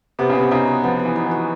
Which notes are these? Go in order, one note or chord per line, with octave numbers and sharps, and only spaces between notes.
C3 B3
C#3
C3 B3
C#3 D#4
F#4
F3 B3
B3
E3
D#4
E3
F#4